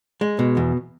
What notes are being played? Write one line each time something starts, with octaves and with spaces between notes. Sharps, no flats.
G#3
B2
E2